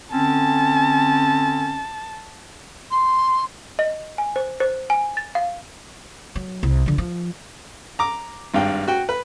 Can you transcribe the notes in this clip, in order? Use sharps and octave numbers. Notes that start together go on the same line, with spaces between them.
D3 C4 C#4 A5
C6
D#5
G#5
C5
C5
G#5
A6
F5
F#3
C2
D3 F3
F3
A#5 D6
G#1 G2 F5 G5
F#4 G5
B4